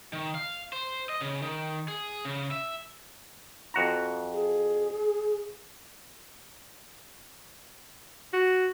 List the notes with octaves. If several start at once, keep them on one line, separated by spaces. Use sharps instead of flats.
D#3
F5
C5
D#5
C#3
D#3
G#4
C#3
E5
F2 F#4 A#5
G#4
F#4